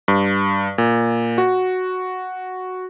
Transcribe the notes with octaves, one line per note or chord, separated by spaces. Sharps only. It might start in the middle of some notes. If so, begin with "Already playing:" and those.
G2
A#2
F#4